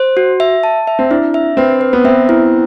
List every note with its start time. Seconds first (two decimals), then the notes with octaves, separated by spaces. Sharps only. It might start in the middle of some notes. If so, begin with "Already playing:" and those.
Already playing: C5
0.17 F#4
0.40 E5
0.63 A5
0.87 E5
0.99 C4
1.10 D4 E4
1.34 E5
1.57 C4 B4
1.81 B4
1.93 B3
2.04 C4 E5
2.29 E4